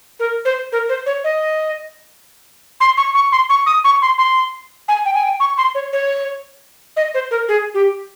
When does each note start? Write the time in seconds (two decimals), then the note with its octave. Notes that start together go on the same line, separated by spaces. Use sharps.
0.20 A#4
0.45 C5
0.72 A#4
0.89 C5
1.06 C#5
1.24 D#5
2.80 C6
2.97 C#6
3.15 C#6
3.32 C6
3.49 C#6
3.66 D#6
3.84 C#6
4.02 C6
4.18 C6
4.88 G#5
5.05 G5
5.14 G#5
5.23 G5
5.40 C#6
5.58 C6
5.75 C#5
5.93 C#5
6.97 D#5
7.14 C5
7.31 A#4
7.48 G#4
7.74 G4